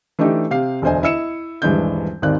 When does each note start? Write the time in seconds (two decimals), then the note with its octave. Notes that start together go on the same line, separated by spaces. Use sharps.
0.19 E3 A3 D4 D#4 G4
0.51 C3 G4 F5 C7
0.82 E1 D2 D4 C5 D#5 G#5
1.03 E4 D#5 E6 C#7 E7
1.62 D#1 G2 E3 G#3 D4 G6
2.22 G#1 D#2 D#3 D5 F#6